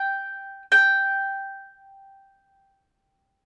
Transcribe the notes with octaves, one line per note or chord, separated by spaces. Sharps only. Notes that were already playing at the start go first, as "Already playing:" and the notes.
Already playing: G5
G5